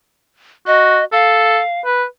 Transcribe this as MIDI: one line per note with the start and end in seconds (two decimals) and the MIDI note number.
0.67 1.00 66
0.67 1.05 75
1.12 1.59 69
1.12 1.81 77
1.85 2.05 71